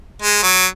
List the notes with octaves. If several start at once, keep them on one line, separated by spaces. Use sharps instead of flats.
G#3
F#3